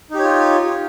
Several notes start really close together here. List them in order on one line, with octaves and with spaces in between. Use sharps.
D#4 G4 C#5 F4